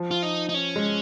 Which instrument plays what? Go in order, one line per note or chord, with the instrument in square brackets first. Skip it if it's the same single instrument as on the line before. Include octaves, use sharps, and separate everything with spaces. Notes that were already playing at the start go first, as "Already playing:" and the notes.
Already playing: [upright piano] F3
[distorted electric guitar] F4
D#4
D#4
C#4
[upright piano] G#3